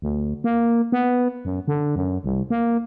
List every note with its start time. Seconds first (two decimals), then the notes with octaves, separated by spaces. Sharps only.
0.02 D2
0.44 A#3
0.92 B3
1.45 F#2
1.68 D3
1.96 F#2
2.24 C2
2.50 A#3